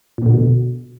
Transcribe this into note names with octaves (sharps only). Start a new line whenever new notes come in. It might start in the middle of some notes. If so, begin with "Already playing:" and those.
A#2
D3
B2